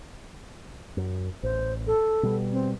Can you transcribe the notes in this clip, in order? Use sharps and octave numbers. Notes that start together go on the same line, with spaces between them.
F#2
A1 C5
A4
B2 G3 B3
C4